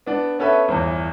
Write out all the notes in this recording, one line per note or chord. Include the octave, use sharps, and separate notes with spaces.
B3 D4
B3 C#4 A4 B4 E5
G1 E2